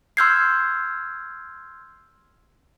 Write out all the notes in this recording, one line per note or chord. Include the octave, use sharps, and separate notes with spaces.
C6 E6 F6 G6 G#6 C7